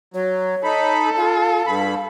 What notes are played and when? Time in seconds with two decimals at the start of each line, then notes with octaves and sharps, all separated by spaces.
0.14 F#3 C#5
0.64 D#4 A4 B5
1.17 F4 F5
1.66 G2 B5